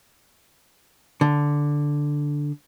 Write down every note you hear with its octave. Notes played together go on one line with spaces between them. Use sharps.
D3